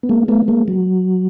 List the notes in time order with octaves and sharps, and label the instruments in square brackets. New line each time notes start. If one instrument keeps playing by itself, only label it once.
[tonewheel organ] B3
G#3 A#3
A3 B3
G#3 A#3
F#3